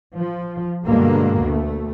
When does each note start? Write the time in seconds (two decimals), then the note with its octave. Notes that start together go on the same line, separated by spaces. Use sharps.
0.17 F3
0.84 G2 B2 D3 G#3 A#3
1.39 D2 A3